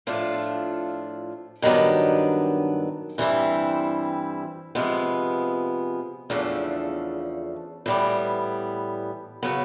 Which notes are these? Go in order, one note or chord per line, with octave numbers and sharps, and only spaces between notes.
A2 F3 A3 D4 F4
G2 D#3 F#3 B3 D4
G2 E3 G3 C4 E4
C3 F3 G#3 B3
E2 C#3 F3 A3 D4
A2 E3 G3 B3
C#3 F#3 B3